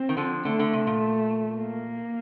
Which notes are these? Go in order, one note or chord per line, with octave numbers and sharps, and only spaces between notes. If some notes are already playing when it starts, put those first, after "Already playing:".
Already playing: C4
D#3
D3 F3
D3 A3
D3
C3
A#2
A#3